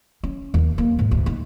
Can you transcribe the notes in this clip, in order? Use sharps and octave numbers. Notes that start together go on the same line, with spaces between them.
C#4
D#2
A#3
G#2
D2
D#4